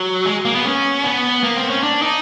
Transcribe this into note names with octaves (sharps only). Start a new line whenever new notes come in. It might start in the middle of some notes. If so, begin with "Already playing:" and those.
Already playing: F#3
G#3
A#3
B3
C#4
B3
A#3
C4
C#4
D4
D#4